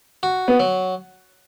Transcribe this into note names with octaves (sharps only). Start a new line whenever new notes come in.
F#4
B3
F#3